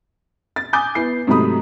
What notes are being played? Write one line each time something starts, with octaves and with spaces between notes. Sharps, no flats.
A6
G#5 D6 D#6 G6 A6
B3 E4 C7
G#2 C3 F#3 A3 B5 D#6